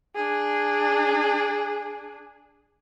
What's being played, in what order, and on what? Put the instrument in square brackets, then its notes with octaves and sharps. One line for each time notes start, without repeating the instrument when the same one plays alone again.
[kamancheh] D4 G#4